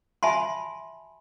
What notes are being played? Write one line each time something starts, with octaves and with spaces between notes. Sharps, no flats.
E5 G#5 A5 B5 C6